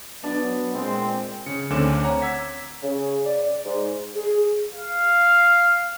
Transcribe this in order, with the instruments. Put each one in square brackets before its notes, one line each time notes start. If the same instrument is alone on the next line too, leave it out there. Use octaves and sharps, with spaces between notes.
[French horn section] F#3 [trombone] B3 [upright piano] D4
[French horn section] A#2 [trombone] G#3 [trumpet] C4
[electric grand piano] C#3 C#7
D2 D3 C4 C#4 D6 E7
C#5 F#5 A#5
E6 G#6 B6
[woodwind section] C#3
D5
G#2
[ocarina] G#4
[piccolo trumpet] F5